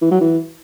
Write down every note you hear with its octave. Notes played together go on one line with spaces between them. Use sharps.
E3
F#3
E3